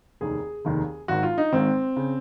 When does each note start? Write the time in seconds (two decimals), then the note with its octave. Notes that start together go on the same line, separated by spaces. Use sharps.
0.21 F1 D#2 D#3 G#4
0.65 F1 D#2 D#3
1.08 G#1 G#2 D#3 F#4
1.23 F4
1.38 D#4
1.52 G#1 G#2 D#3 C4
1.96 C#3